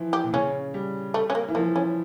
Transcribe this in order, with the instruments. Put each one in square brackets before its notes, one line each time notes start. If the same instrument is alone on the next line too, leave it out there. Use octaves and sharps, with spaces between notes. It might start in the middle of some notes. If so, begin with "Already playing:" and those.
Already playing: [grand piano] E3 F3
[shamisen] G4
[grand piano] A#2
[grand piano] C#3 [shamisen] C#4
[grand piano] G3
[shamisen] A3
C#4
A#3
[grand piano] E3
[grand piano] F3 [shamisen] A#3
[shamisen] C#4